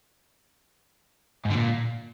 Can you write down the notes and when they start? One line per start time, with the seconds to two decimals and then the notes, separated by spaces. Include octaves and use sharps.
1.45 G#2
1.50 D3
1.55 A#2